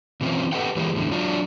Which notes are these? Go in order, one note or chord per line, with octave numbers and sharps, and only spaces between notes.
B2 E3 C4 C#4 F4
G4 A4 B4 D#5 F#5 G5
E3 G#3 A#3 G4
E2 A2 D3
F#3 D4 F4